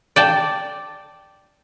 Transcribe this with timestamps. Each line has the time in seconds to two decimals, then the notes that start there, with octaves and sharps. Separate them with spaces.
0.16 D5 G5 A5